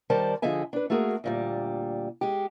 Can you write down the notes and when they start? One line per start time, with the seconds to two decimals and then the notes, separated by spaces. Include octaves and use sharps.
0.10 D#3 G3 A#4 C5 D5 A5
0.42 D3 F3 G#4 D#5 E5 G#5
0.73 D4 B4
0.90 A3 A#3 F#4 G#4 A#4
1.24 D2 A#2 G3
2.21 G#3 G4